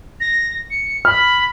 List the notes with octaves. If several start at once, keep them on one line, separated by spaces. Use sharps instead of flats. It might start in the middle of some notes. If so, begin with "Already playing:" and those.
A#6
C#7
B5 F6